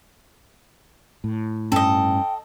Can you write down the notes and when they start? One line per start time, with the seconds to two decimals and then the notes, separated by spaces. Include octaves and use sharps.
1.24 A2
1.72 G2 C#4 A4 D#5 G5